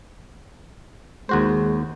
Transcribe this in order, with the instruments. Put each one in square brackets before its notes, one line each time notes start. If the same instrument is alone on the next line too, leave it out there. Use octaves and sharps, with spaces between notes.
[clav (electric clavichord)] D#2 F#4 C5 [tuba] G#3